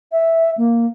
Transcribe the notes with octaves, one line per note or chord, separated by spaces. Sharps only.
E5
A#3